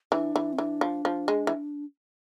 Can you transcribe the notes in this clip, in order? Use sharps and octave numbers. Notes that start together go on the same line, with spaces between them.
E3 D4
E3
C4
E3 D4
F3
F3
G#3
E3